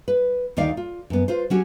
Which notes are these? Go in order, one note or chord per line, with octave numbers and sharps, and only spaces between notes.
B4
D2 D#3 D#4 D5 F5
F4
F#2 B3
F4 B4 C5
F#3 C#4 F#4 G4